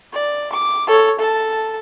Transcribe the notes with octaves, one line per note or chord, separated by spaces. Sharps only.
D5
D6
A4 C#5
A4 A5